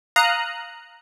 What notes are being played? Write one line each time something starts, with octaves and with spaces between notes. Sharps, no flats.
F5 A#5 D#6 F#6